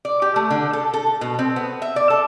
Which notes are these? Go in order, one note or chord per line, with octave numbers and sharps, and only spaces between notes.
D5
G4
A3
D3
A4
A4
B2
C4
B3
E5
D5
A4